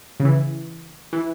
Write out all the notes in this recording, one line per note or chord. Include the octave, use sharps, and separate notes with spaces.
C#3
E3
E3